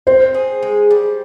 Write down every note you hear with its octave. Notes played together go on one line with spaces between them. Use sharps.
C4 C5
G#4
G#3
G3